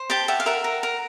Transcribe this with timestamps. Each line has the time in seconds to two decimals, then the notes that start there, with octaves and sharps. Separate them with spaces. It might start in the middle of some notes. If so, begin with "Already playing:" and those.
Already playing: C5
0.10 G4 G5 A5
0.28 G4 E5 F#5
0.40 F5
0.46 A#4 E5 F#5
0.64 A#4
0.83 A#4